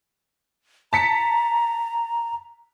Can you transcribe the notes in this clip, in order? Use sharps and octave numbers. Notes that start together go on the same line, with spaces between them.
A5 A#5 B6 C#7